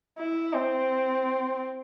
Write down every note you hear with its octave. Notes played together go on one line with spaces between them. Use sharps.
E4
C4